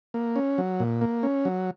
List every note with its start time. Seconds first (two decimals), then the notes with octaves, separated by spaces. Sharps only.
0.14 A#3
0.36 C#4
0.58 F#3
0.80 A#2
1.01 A#3
1.23 C#4
1.45 F#3